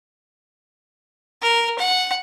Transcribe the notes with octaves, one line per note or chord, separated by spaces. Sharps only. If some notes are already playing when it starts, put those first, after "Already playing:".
A#4
F#5